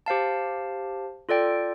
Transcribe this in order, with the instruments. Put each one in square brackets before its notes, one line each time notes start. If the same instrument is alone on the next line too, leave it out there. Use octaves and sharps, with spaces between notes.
[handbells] G4 C5 F5 A5
F4 A4 D5 G5